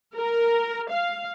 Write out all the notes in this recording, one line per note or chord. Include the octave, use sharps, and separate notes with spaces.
A#4
F5